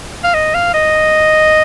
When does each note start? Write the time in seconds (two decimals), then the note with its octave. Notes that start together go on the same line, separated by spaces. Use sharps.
0.24 F5
0.34 D#5
0.54 F5
0.74 D#5